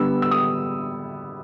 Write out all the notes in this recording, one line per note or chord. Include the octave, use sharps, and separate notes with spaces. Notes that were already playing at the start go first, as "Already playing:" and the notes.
Already playing: D3 G3 B3 E6
E6
D#6